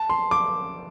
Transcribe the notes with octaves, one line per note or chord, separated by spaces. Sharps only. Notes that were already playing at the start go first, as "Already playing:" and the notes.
Already playing: A5
C6
D6